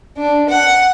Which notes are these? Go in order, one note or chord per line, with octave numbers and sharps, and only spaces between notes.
D4
F#5